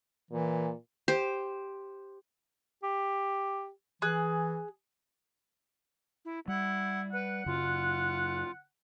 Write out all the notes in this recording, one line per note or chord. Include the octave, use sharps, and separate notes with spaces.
A#2 E3
G4 C5
G4
E3 G#4 F#6
E4
G3 E4 F#5
B4 F#5
F#2 C#3 F4